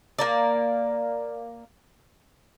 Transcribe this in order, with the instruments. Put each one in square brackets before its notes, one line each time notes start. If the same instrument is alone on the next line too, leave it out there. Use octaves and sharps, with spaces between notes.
[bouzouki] A#3 A#4 D5